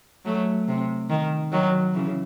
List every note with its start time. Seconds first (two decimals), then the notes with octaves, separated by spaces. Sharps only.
0.25 F#3 A3
0.68 C3
1.10 D#3
1.52 D#3 F#3
1.94 C#3 E3